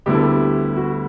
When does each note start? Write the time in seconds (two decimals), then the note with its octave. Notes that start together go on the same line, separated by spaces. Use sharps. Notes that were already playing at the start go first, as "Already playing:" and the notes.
0.06 D2 D3 G3 B3 E4 G4
0.15 A4
0.23 G4
0.76 F#4